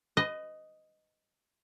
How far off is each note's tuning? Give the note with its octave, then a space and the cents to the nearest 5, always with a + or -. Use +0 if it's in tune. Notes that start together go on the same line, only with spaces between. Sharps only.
B4 +35 D#5 +0